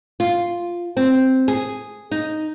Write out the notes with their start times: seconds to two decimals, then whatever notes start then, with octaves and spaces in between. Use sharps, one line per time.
0.20 F4
0.97 C4
1.48 G#4
2.11 D#4